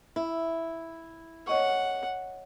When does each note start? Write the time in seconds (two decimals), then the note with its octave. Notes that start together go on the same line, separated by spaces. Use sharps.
0.16 E4
1.47 C#5 D#5 F#5 C#6